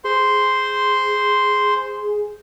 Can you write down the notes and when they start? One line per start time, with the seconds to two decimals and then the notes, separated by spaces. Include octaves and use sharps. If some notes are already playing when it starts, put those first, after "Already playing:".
0.04 G#4 C5 C6